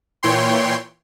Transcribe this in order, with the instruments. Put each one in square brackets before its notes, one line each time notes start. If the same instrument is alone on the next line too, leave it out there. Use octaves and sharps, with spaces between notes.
[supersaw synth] A#2 E3 C#5 G5 C6